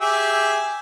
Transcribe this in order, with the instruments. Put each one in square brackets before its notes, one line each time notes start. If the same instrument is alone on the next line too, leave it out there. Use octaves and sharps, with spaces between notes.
[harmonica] G4 G#4 E5